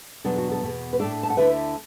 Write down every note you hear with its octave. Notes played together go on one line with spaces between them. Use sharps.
E2 B2 F#3 B3 D4 A4
F#4
A4
E2 B2 B3
B4
A2 A3 D4 A4 D5
A5
F#5
D2 D3 A3 E4 B4 E5